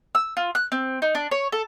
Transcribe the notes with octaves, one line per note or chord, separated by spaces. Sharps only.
E6
F4
F#6
C4
D#4
D4
C#5
A4